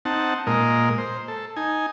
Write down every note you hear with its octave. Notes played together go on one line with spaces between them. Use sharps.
C4 D#4 F#5 A5
A#2 G#3 A#4 D#5
C5
A4
D#4 G#5